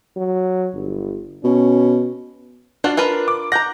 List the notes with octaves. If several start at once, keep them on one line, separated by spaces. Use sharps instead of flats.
F#3
G1
B2 C#4
D4 F4 F#4 F#5
F4 A#4 B4
D6
F#5 A#5 G6 A#6